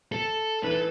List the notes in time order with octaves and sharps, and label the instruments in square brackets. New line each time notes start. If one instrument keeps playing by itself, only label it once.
[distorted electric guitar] A4
[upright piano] E3 [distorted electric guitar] B4
[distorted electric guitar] A4